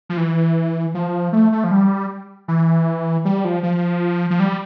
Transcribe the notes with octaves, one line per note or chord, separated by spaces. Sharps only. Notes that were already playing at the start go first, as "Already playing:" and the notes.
F3
E3
F3
A3
A3
F3
G3
E3
G3
F3
F3
F3
G3